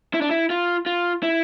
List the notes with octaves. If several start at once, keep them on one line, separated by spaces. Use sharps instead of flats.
E4
D4
E4
F4
F4
E4